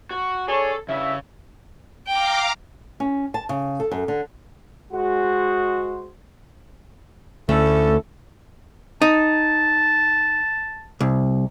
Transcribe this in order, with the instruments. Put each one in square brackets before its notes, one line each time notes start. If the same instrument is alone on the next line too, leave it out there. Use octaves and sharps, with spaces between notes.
[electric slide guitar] F#4
[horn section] D4 G#4 C#5 [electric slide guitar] A4
[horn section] G2 E4 E5 [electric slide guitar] C#3
[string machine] F5 A#5 D6 [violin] G5
[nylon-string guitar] C#4
A5
C#3
A4
F#2
D3
[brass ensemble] G#3 F#4 C5
[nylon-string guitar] D2 A3 [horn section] C#4 E4 A4
[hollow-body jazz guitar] D#4 [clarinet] A5
[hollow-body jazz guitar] C2